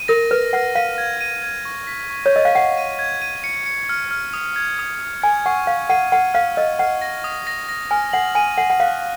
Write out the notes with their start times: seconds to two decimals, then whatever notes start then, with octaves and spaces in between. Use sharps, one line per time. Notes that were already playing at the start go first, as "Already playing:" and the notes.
Already playing: D#7
0.08 A#4 A#6
0.31 B4 F6
0.53 F#5 F6
0.75 F5 D#7
0.98 G#6
1.21 D#7
1.43 G#6
1.65 C#6
1.87 B6
2.10 C#6
2.26 C#5
2.33 D#5 C#6
2.45 F5
2.55 F#5 C#6
2.77 D#7
2.99 G#6
3.22 D#7
3.44 C#7
3.66 C#7
3.89 F6
4.11 F6
4.33 D#6
4.56 G#6
4.79 D#6
5.01 D#6
5.22 G#5 G#6
5.46 F#5 C#6
5.67 F5 C#6
5.90 F#5 D#7
6.12 F#5 F6
6.34 F5 F6
6.56 D#5 F6
6.79 F#5 F6
7.02 A#6
7.24 D#6
7.47 A#6
7.69 A#6
7.91 G#5 F6
8.13 F#5 F#7
8.35 G#5 D#7
8.58 F#5 F#7
8.70 F#5
8.80 F5 F#6